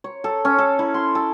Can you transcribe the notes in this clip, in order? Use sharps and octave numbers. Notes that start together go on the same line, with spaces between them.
C#5
A4
C#4
A4
E4
C6
A4